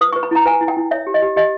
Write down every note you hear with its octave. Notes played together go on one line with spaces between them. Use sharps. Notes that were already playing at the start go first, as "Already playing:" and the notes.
B4 D#6
B4 C#6
B5
E4 A#5
B4 G#5
E4
G5
E4
C#5 E5
G4
D#5
G4
G4 D#5